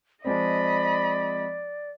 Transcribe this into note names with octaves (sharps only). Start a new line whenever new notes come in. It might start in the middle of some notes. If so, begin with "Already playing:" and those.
F3 G#3 C4 D5 D#5 B5